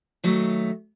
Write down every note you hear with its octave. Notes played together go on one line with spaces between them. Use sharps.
D#3 F#3 A3